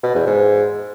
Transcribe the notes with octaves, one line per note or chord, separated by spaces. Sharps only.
B2
E2
G#2